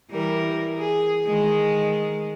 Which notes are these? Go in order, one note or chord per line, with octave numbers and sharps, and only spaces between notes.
E3 G3 A#4
G#4
D#3 G#3